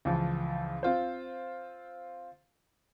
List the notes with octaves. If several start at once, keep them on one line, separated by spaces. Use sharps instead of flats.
C#2 E3 F3
C4 F4 C5